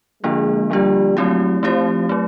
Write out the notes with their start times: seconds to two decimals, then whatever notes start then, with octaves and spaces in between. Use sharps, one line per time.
0.23 D3 F3 G#3 A#3 D4 F4
0.70 D3 F3 G3 A#3 D4 F4
1.16 F#3 A3 C4 E4 G4
1.63 F3 A3 C4 E4 G4
2.09 F#3 A3